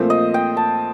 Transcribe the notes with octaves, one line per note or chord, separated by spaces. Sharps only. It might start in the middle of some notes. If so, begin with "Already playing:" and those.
Already playing: A#2 F3 A3 C4
D#5
G5
A5